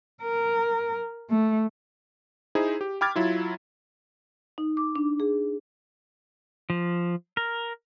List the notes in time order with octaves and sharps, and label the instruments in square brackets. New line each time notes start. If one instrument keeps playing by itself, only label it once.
[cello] A#4
A3
[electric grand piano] D#4 E4 G#4 C5
G4
G5 B5 D6 F6 G#6 A6
F#3 E4 F4
[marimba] D#4
D6
D4
G#4
[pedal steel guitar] F3
A#4